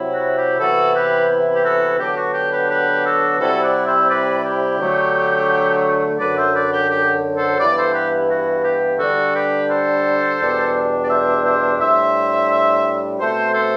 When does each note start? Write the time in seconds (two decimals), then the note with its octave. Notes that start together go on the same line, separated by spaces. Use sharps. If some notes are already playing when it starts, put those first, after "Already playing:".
Already playing: C3 F#3 C4 E4
0.12 F#4
0.35 G4
0.58 C3 E3 B3 E4 F#4 A4
0.94 G4 B4
1.53 G4
1.64 F#4 A4
1.99 D3 F#3 B3 D4 G4
2.17 F#4
2.34 G4
2.51 G4 B4
2.69 G4 B4
3.04 F#4 A4
3.39 C3 G3 C4 E4 F#4 A4
3.62 D5 F#5
3.86 C5 E5
4.09 B4 D5
4.44 G4
4.79 D3 F#3 A3
6.19 F#2 D3 F#3 B4 D5
6.36 C5 E5
6.54 B4 D5
6.72 G4
6.90 G4
7.36 A4 C5
7.59 G2 E3 B3 E4 B4 D5
7.77 A4 C5
7.94 G4 B4
8.29 F#4
8.64 G4
8.99 D3 G3 D4 F#4 A4
9.34 G4 B4
9.69 A4 C5
10.40 E2 B2 G3 D4
11.04 D5
11.10 C5 E5
11.44 C5 E5
11.79 A2 G3 D4 C5 E5
13.20 B2 A3 C4 A4 C5
13.54 A4 C5